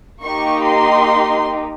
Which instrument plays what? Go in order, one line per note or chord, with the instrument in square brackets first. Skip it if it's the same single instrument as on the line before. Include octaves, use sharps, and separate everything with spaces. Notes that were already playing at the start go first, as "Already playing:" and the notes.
[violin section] A#3 D#4 G4 C#6
C6